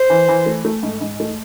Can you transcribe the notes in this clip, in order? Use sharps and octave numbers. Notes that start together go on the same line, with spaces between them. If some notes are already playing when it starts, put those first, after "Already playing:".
Already playing: C5
E3
E3
A3
A3
G#2
G#2
A3